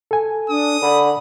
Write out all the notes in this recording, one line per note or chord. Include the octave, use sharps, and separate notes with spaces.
A4 G#5
D4 D#6
D3 B5